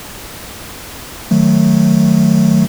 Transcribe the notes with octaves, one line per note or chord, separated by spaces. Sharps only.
D#3 F#3 A3